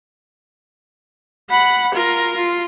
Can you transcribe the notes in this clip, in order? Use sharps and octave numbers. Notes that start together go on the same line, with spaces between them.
F#5 B5
F4 A#4
F4